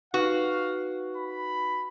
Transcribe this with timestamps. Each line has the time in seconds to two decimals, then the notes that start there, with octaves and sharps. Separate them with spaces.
0.14 D#4 F#4 B4 F5 F#6
1.17 B5